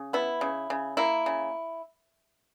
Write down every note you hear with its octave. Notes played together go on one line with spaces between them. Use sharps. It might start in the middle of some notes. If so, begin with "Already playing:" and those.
Already playing: C#3
B3 E4
C#3
C#3
A#3 E4
C#3